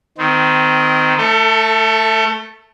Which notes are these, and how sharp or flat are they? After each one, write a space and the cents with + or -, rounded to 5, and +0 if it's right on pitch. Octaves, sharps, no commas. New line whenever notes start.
D#3 +0 C4 -30
A3 +0 A4 +30